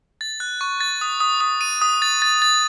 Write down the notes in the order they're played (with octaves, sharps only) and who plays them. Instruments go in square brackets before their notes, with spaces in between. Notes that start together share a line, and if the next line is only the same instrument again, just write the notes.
[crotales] A6
F#6
C#6
A6
D#6
D#6
D#6
D#7
D#6
A6
A6
A6